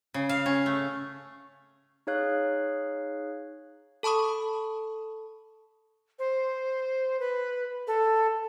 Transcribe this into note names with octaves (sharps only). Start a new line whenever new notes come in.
C#3
F5
C#4
A3
D#4 G#4 C#5 F5 F#6
A4 A5 B5 C#6 D#6
C5
B4
A4